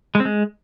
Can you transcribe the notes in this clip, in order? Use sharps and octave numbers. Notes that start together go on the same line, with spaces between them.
G#3
C4
G#3